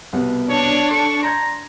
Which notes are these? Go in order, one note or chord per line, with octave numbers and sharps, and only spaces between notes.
C2 B2 B3
D4 C#5
A4 C#6
A#5 C6 G6 G#6